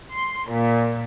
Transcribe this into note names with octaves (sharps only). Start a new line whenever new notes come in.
C6
A#2